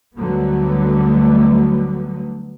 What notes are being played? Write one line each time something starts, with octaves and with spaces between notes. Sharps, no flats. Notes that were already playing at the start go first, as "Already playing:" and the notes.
D2 D3 F#3 G3 A3 B3